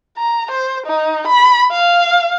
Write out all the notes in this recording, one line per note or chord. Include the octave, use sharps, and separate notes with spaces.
A#5
C5
D#4
B5
F5